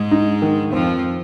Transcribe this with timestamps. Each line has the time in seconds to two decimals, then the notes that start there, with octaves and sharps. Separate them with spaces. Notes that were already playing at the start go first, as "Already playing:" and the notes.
Already playing: G#2 G#3
0.11 D#4
0.42 D#3
0.72 F2 F3 C4